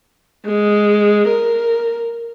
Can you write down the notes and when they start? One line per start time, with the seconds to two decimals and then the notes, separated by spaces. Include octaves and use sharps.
0.46 G#3
1.28 A#4